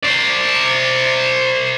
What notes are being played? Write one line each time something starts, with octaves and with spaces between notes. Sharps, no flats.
C5 D5